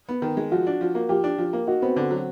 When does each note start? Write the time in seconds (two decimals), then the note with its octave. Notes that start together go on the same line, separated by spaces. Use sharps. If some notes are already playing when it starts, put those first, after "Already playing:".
0.09 B3
0.22 D#3
0.37 G#3
0.51 F3 F#4
0.67 D4
0.81 F3
0.95 A#3
1.09 F3 G4
1.24 D4
1.38 F3
1.53 A#3
1.67 D#4 F#4
1.82 B3 C4
1.96 D3
2.11 F#3